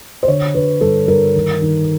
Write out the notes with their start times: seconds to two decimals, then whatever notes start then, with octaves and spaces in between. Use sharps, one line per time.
0.23 C5
0.28 D3 C#5
0.54 D3 B4
0.81 G2 A4
1.08 G2 A#4
1.34 D#3
1.61 D#3